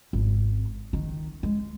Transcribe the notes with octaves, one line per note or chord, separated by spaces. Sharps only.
G#1
D#3
G#3